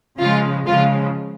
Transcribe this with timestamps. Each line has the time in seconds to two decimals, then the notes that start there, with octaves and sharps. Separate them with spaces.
0.19 C#3 F3 G#3 F4
0.66 C#3 F3 G#3 F4